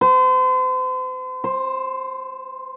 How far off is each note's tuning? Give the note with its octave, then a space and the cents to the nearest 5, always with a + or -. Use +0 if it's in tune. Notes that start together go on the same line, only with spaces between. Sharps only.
C5 -40
C5 +10